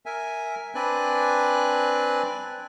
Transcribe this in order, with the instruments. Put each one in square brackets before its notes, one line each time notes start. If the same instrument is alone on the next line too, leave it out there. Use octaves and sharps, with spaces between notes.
[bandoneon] A#4 E5 G#5
C4 D4 B4 D5 G#5 F#6